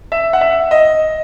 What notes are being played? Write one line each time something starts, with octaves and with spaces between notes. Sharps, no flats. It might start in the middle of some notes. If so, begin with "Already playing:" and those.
E5
F#5
E5
D#5